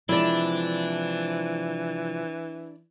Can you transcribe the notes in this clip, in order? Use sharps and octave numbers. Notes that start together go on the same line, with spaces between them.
C3 E3 F3 G#3 D4 E4 D5